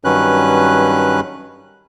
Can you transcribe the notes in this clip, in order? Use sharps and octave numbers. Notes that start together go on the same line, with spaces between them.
G2 D#3 F#3 C#4 B4 F#6